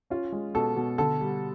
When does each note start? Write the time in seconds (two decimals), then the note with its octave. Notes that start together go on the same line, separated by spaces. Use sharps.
0.10 C#4 F4
0.32 G#3
0.55 B2 A4
0.76 B2
0.98 D3 A4
1.21 G3